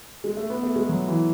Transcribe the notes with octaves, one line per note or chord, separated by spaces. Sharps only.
G#3
A3
B3
A3
G#3
F#3
E3